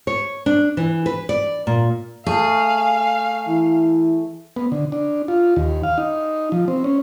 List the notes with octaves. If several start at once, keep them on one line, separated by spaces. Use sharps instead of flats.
C#5
D4
E3
B4
D5
A#2
A3 G#4 F5
E3
B3
D3
D4
F4
D#2
F5
D#4
F3
C4
C#4